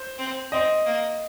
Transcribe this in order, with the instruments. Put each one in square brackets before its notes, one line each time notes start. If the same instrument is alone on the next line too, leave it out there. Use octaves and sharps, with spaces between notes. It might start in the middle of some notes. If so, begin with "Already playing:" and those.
Already playing: [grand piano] C5
[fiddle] C4
[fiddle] C4 [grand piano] D#5
[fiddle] A#3